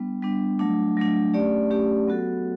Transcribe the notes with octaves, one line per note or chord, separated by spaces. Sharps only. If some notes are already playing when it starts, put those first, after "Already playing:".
Already playing: G3 B3 D4
G3 B3 D4
F#3 A3 D4
F#3 A3 D4
A3 C#4 G4 D5
A3 C#4 G4 D5
F#3 B3 F#4 A4